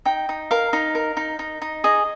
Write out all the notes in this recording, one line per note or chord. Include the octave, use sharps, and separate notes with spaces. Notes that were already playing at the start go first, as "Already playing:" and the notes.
D#4 G5
D#4
A#4 F5
D#4
A#4
D#4
D#4
D#4
G#4 D#5